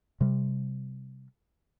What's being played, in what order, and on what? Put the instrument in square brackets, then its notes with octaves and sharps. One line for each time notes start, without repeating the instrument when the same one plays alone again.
[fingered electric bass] C3 G3